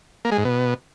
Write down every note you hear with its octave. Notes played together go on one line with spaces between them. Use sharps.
A#3
G#3
G#2
B2